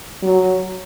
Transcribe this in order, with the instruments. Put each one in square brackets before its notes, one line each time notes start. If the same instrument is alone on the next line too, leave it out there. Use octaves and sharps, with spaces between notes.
[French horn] F#3